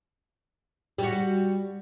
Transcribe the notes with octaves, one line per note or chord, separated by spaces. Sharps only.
G3 F#4